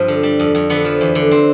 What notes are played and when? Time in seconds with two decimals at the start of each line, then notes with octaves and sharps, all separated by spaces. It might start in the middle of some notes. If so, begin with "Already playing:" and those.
Already playing: G2 F3 C4
0.08 D3
0.23 G3
0.40 F2
0.55 F2
0.70 D3 B3
0.85 F3
1.01 E2
1.15 D3
1.31 C4